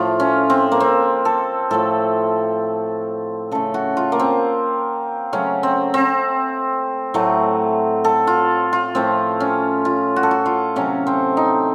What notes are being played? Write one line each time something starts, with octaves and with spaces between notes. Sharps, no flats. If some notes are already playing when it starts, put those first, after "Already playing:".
Already playing: A2 F3 A3 F4
C#4
C4
A#3
C4
A4
A2 F3 A3 A4
C#3 A3 A4
F#4
F4
A#3
C4
C#3 F#3 A3 C#4
C4
C4
A2 F#3 A3
A4
F4
F4
A2 F3 A3 C4
C#4
F4
F#4
A4
F#4
F4
C3 F#3 A3 C#4
C4
D#4